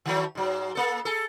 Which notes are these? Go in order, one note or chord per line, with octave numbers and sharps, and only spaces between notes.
D#3 F#3 A3
G#2 F#3
A#3 A4
G#4 A4